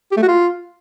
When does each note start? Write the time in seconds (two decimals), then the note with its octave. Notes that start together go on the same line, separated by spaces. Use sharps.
0.12 G4
0.17 A3
0.23 F#4
0.28 F4